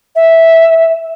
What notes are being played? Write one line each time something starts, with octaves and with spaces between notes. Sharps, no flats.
E5